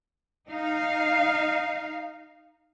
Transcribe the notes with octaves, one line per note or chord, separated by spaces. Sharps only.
D#4 F5